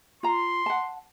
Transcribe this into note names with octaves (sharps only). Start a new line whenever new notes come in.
F4 A#5 C6
F#5 A5